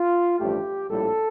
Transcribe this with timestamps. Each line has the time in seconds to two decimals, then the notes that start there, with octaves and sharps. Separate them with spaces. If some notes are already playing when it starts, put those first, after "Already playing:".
Already playing: F4
0.38 A1 G2 F3 A3 G4
0.90 A#1 A2 G3 A4